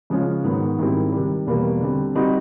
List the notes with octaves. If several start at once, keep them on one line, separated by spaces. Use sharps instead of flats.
C#3 F3 G#3 C#4
G#2 D#3 F#3 B3
G#2 D#3 G3 C4 E4
C3 D#3 G3
E2 B2 G3 A#3
D3 G3 C4
G3 C4 D#4 F#4